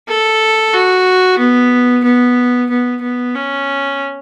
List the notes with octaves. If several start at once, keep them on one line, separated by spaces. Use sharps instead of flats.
A4
F#4
B3
B3
B3
B3
C#4